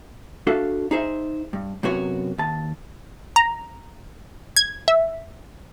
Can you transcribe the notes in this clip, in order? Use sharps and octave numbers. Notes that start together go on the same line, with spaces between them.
D4 F#4 A4 E5 F5
D#4 G#4 C5 E5
G2
F#2 C3 B3 F#4 C#5
D#2 A5
A#5
G#6
E5